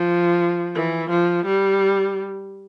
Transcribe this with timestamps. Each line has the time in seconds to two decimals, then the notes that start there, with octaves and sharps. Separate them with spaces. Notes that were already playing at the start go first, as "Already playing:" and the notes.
Already playing: F3
0.75 E3
1.10 F3
1.46 G3